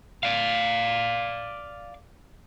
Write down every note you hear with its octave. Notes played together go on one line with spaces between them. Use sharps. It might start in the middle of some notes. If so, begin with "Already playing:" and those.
D5 F5